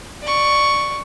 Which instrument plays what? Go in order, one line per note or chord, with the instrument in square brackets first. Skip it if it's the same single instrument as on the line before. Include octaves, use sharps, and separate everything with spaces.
[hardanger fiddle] D5 C#6